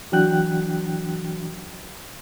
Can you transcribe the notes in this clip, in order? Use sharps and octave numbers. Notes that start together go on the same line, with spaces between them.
E3 F#3 D4 F#4 G5 F#6